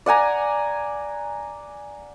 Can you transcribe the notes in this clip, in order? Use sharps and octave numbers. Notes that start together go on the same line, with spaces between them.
D5 F#5 G#5 A#5